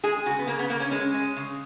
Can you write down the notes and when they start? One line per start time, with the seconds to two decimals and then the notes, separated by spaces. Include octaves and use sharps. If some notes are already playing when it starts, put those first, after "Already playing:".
0.03 G#3 G#4
0.26 C#3 F#4
0.39 B3
0.47 C#3 A#3
0.59 B3
0.70 C#3 A#3
0.80 C#4
0.91 G#3 C#4
1.14 G#3
1.36 C#3